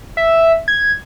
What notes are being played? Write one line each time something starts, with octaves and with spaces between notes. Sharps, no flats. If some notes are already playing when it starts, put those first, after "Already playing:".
E5
G#6